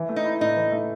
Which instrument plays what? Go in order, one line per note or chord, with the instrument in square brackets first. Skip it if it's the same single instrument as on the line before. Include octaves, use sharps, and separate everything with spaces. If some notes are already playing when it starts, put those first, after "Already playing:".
Already playing: [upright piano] E3
A3
[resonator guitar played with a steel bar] D#4
[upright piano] E4
[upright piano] A2 [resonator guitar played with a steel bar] D#4
[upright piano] E3
A3